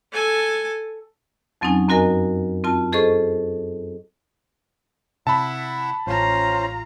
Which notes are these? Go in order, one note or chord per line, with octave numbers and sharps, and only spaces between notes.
A4 G#5
F2 F#3 C4 C#4 D#4 G#5
F#2 C4 F#4 A#4 D#5 G#5
C4 F4 A5
G#4 A4 C5 D#5 C#6
C3 E4 E5 F#5 A5 B5
A1 C#4 F4 C5 A#5